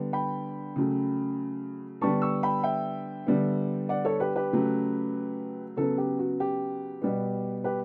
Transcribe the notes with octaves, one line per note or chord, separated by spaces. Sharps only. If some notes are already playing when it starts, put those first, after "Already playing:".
Already playing: D3 G3 B3
G5 B5
C#3 F#3 A3
D3 G3 B3 A5 C#6
C#6 E6
G5 B5
E5 G5
D3 G3 B3
D5 F#5
A4 C#5
G4 B4
G4 B4
C#3 F#3 A3
C#3 F#3 B3 F#4 A4
G4
F#4
G4
B2 G3 B3
G4 B4